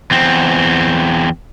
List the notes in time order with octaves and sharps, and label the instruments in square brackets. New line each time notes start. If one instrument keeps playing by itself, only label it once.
[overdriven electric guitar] E2 C4